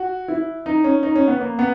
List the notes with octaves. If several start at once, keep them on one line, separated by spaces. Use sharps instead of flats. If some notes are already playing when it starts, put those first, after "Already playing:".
Already playing: F#4
E4
D#4
C#4
D#4
C#4
B3
A#3
B3